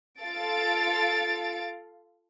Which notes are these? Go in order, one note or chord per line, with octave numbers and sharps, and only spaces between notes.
F4 A4 F5 A6 D7